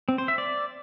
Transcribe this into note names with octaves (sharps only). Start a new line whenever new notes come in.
C4
C5
E5
D5